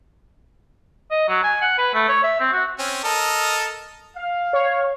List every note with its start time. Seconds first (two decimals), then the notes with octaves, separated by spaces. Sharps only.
1.11 D#5
1.28 F#3
1.44 G#5
1.62 F#5
1.78 B4
1.94 A3
2.09 C#5
2.23 E5
2.40 C4
2.52 F#4
2.79 C4 C#4
3.04 A4 A#4 D#5
4.17 F5
4.53 C#5